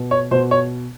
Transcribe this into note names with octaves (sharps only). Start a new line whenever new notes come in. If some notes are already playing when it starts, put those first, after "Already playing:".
Already playing: B2
C#5
B2 C5
C#5